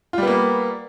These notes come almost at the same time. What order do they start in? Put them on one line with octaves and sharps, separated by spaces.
F4 G3 B3 A#3